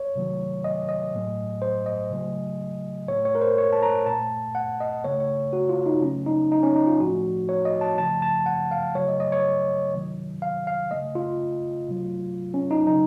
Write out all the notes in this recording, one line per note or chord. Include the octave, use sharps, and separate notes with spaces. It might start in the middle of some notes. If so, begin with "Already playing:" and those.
Already playing: C#5
C3 D#3 F#3 A3
D#5
D#5
A2 F#3 A3
C5
D#5
C#3 F#3 A3
A2 A3 C#5
C#5
A#4
C5
C#5
A5
A#5
A#2 A3 A5
F#5
D#5
C#3 A3 C#5
C#5
F#4
F4
D#4
C#3 F#3 A3 C#4
D#4
D#4
C#4
D#4
F4
A2 F3 A3 F#4
C#5
D#5
A5
C#3 F3 A3 A5
A5
F#5
F5
C#3 F#3 A3 C#5
D#5
D#5
C#5
C3 D#3 F#3
F5
F5
C#3 A3 D#5
F4
C3 F#3 A3
C#4
D#4
C#3 F#3 A3 D#4